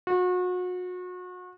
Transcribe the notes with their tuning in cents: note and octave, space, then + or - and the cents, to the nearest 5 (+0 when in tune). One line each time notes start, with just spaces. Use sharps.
F#4 -35